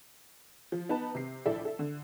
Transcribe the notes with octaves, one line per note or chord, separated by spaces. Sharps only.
F3
B3 D#4 B4 A5
C3 C7
A#1 A2 A4 D5 E5
A4 E5
D3